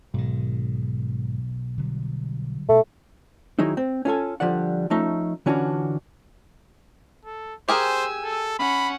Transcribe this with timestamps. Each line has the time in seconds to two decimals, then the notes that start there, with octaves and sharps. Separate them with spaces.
0.14 B1 G#2 D#3
1.78 D3 F#3 G3
2.69 B2 A3
3.59 D#3 F#3 G#3 D#4 E4
3.77 C4
4.05 C#4 F4 A4 G#5
4.40 D3 F3 G3 D5 F#5
4.90 F3 A3 C#4 D#4 E5
5.46 D3 E3 C#4 D4 F4 F#4
7.25 A4
7.69 G4 G#4 A#4 C5 G#5 E6
8.23 A4
8.59 C#4 F#5 B5